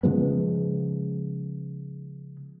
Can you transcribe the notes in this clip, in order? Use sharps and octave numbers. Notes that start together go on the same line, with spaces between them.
C#3 F3 G#3 B3